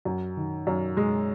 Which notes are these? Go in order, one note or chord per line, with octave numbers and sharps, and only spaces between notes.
F#2
D#3
F#2
G#3